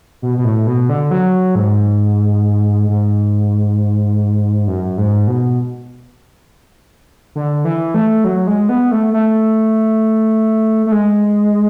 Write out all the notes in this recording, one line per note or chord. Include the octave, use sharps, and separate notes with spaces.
B2
B2
A2
B2
D3
F#3
G#2
G#2
F#2
G#2
B2
D3
E3
A3
F#3
G#3
B3
A3
A3
A3
G#3